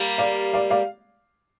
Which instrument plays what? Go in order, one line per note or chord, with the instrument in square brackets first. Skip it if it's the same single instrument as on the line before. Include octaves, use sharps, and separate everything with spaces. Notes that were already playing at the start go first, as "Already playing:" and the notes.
Already playing: [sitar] G3 A#3
[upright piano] D5 F5
D5 F5
D5 F5